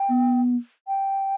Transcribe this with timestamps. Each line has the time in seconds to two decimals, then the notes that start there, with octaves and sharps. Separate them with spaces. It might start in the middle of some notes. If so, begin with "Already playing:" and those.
Already playing: G5
0.09 B3
0.88 G5